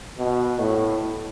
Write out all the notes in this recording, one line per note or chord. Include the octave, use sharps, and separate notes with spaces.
B2
A2